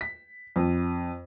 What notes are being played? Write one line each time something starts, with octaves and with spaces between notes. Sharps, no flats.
B6
F2